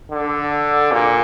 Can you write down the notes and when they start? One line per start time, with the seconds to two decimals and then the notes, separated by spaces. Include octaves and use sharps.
0.11 D3
0.92 A#2